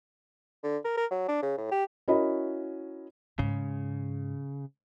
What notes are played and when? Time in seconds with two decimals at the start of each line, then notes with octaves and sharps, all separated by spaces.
0.63 D3
0.85 A#4
0.97 A#4
1.11 F#3
1.28 D4
1.42 C#3
1.58 A2
1.71 G4
2.08 C#4 E4 F#4 A#4 D#5 B5
3.39 G#2 C#3